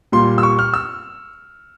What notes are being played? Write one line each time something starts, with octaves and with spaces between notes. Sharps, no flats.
A#2 G3 A#3 C6
E6
C#6
F6
E6